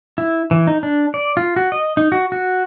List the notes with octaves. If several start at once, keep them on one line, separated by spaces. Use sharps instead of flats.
E4
E3
D#4
D4
D5
F4
F#4
D#5
D#4
F#4
F#4